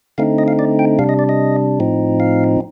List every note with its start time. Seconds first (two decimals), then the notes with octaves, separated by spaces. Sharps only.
0.18 D3 A3 C4 D#4 F5
0.38 D#5
0.48 F5
0.59 D5
0.79 G5
0.99 C3 G3 D4 F5
1.09 D#5
1.19 D5
1.29 D#5
1.80 A2 F3 C4 D#4
2.20 F5